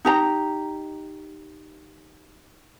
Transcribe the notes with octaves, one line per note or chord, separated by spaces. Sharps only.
D#4 G4 A#5